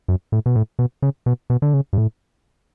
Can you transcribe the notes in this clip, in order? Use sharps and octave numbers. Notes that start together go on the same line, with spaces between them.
F#2
A2
B2
A2
B2
C#3
B2
B2
D3
C#3
G2
A2